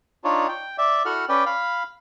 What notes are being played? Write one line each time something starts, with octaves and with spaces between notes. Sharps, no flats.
D4 D#4 F4 C#5
G5
D5 E5
E4 F#4 A4 F#5 F6
C#4 B4 D5 G5
F5 B5